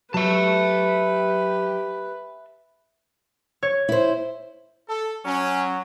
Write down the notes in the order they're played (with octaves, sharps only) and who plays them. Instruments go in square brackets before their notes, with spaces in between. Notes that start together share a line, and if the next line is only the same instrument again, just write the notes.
[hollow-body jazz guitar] F#3 [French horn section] G4 [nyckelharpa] B4 [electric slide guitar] E5 A5
[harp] C#5
[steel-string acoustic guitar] E4 C5
[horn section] A4
[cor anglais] F#3 [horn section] C#4